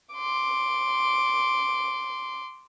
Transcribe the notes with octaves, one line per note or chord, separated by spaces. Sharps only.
C6 D6